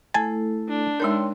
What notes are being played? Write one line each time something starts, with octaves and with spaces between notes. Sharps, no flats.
A3 E4 A4 G#5 A5
D4
G#3 D#4 A#4 C#5 G5 C6